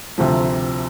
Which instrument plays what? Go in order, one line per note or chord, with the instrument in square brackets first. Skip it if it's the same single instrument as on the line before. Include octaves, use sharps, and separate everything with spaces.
[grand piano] D2 C3 F3